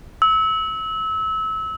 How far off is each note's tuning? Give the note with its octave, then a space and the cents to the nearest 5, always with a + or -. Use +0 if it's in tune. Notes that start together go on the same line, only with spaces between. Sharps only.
E6 -25